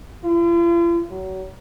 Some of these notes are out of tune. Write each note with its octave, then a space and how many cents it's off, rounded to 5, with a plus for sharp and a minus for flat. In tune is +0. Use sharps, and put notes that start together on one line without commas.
F4 -45
F#3 +30